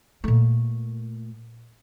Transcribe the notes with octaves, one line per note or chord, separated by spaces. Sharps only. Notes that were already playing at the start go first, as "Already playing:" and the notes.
A#2 A3